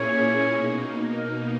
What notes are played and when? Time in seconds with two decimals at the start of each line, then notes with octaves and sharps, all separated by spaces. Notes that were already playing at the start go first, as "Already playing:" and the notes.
Already playing: A#2 A#3 C#4 E4 G#4 C#5
0.51 B2 A#3 D#4
1.14 A#4